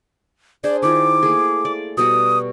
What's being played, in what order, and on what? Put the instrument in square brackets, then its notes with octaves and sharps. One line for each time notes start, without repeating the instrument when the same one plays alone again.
[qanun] D4 G#4 C5 [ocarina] D5
[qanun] D#3 E4 F4 [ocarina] D6
[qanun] A3 A#3 G#4
D5
[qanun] B2 G3 F#4 [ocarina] D#6